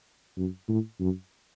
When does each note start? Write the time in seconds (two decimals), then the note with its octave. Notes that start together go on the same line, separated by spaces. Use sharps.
0.37 F#2
0.68 A2
1.00 F#2